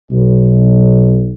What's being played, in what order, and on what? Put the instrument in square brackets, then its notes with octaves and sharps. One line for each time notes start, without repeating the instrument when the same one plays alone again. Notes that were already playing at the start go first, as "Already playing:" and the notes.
[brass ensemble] B1